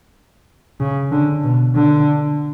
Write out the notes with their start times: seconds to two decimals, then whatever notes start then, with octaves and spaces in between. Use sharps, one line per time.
0.80 C#3
1.12 D3
1.44 B2
1.75 D3